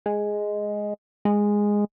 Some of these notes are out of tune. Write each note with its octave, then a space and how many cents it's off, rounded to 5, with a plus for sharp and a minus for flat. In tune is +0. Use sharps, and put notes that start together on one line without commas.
G#3 +0
G#3 -10